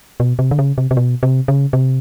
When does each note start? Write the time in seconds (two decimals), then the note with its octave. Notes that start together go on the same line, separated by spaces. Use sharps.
0.20 B2
0.39 C3
0.51 D3
0.59 C#3
0.78 C3
0.91 C3
0.97 B2
1.23 C3
1.48 C#3
1.73 C3